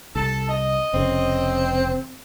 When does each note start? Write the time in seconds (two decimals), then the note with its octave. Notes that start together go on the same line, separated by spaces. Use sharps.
0.15 C2 A4 A5
0.49 D#5
0.94 F1 C#3 C4